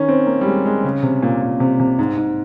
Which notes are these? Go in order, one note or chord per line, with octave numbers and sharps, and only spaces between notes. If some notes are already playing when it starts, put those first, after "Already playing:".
Already playing: D#3 C#4
C4
A#3
G3
G#3
G#3
C#3
C3
A#2
A#2
C3
C3
G#2
G#2